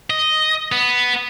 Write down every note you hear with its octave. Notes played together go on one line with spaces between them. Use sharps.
D#5
B3